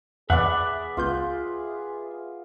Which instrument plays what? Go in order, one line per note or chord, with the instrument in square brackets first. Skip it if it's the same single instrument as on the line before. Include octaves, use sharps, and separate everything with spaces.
[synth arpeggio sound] E2 [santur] B3 D5 [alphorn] G#4 [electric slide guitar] E5 F#5
[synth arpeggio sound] C#2 B3 G6 [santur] F4